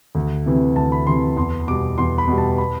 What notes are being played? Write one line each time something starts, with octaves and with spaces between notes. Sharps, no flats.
D2
C3 E3
D2 A5
B5
C3 E3 C6
E2 C6
B2 G3 D6
E2 C6
B5
B2 G3
A5
B5